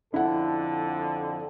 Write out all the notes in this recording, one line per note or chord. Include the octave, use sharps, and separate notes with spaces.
F2 D3 E4 A4 F#5